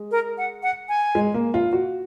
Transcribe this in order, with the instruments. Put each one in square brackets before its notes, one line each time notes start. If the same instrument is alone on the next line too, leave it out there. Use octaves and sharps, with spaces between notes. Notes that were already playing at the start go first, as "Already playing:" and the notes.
Already playing: [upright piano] G#3
[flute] A#4
F#5
F#5
G#5
[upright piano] G#3
A#3
F4
F#4